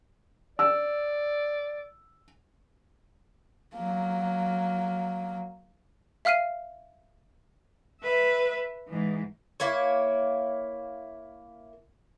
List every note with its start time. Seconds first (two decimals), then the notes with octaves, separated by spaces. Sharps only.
0.59 D5 E6
3.75 F#3 A#3
6.25 E5 F5 F6 C7 D#7
8.02 B4 E5
8.88 G#2 E3
9.60 A#3 E4 C#5